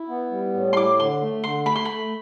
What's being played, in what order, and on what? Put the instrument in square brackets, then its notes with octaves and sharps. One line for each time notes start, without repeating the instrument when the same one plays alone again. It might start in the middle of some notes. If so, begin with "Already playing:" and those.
Already playing: [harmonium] E4
B3
G3
A2
[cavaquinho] C6
[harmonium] E4 [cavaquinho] D6
[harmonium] D3 [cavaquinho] C6
[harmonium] A3
[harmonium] D3 [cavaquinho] C6
[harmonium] A3 [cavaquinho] B5
[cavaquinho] C6
[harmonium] A3 [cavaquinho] B5